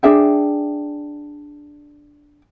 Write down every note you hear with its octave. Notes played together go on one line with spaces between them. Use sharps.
D4 G#4 E5 G5